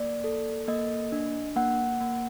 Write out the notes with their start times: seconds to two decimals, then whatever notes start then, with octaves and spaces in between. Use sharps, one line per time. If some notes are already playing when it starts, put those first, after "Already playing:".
Already playing: A#3 D5
0.24 A4
0.68 A#3 D#5
1.12 D4
1.56 A#3 F#5
2.01 A#3